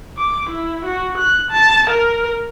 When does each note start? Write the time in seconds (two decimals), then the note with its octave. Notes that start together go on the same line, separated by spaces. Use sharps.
0.18 D6
0.50 E4
0.85 F#4
1.18 F#6
1.51 A5
1.90 A#4